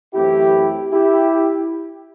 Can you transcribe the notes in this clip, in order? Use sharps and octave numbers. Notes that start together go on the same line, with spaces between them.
F#2 E3 A3 C4 E4 G4
E4 G4